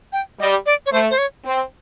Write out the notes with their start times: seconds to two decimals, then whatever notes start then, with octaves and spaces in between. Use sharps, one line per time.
0.13 G5
0.40 G3 D#5
0.66 D5
0.86 C#5
0.92 A3 C5
1.11 C5
1.18 C#5
1.45 C4